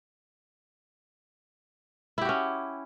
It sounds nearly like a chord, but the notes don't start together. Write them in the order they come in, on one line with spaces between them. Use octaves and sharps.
E4 G4 F#4 C#4